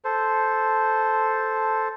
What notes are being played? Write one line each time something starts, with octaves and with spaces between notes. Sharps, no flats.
A4 C5